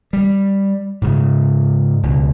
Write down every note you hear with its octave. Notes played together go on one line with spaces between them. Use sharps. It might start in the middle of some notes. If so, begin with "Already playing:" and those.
G3
G#2 C#3
C#2 B2